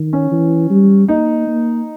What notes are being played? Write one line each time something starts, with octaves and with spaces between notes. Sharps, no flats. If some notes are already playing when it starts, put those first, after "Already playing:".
Already playing: D#3
C#4
E3
G3
A#3 D#4
A#3